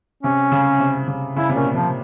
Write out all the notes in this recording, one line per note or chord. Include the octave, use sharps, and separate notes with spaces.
C3 C#4
C#3
C3
C#3
C#3 E4
C3
A#2 C#4
A#2
C3 F3